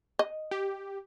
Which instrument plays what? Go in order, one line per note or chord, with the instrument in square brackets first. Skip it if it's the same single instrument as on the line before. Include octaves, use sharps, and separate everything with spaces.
[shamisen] D#5
[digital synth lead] G4